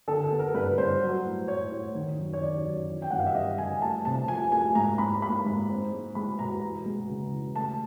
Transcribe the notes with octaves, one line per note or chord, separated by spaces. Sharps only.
D3 A4
A4
B3
A#4
G2 B4
G2 C5
F#3
A2
A2 C#5
A2
D#3
F#2
C#5
D#3 D5
F#2
E3
G5
G2 F#5
F5
E5
G2 D#5
G2 G#5
A3 A5
C3 A5
F3 G#5
A3 G#5
G#2 A#5
G#2 B5
A#3 B5
G#2
C4
G#3
G#3 B5
B2 A#5
E3
G#3
C#3
E3
A3 A5